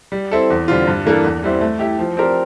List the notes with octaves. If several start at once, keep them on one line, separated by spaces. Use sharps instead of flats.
G3
C4 E4 A4
E2
D3 G3 C4 F4
G2
E3 A#3 D4 A4
E2
E3 G3 C4 E4
A3
E4 G4
F3
C4 G4 A#4 D5